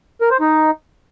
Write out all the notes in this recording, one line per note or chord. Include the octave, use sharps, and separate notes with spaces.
A#4
C5
D#4